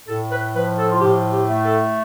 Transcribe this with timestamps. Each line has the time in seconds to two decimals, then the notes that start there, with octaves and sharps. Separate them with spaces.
0.07 A2 A4
0.30 B4
0.54 F3 B4
0.77 A4
0.90 F4
1.01 A2 G4
1.32 G4
1.48 A3
1.64 A4